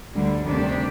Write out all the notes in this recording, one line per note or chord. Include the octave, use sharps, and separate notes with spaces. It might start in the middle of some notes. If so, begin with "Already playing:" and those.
D2 D3 G3
D2 C3 D#3 G3 D4 G4